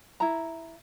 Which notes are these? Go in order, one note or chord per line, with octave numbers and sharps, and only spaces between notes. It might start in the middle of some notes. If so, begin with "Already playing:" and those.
E4 A#5